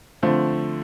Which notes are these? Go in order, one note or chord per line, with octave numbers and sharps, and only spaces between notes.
D3 F3 A3 C4